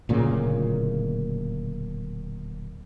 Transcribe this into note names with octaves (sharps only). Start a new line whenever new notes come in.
D1 A#2 C#3 A#3